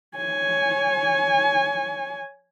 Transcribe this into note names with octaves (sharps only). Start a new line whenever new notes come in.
C#5 G#5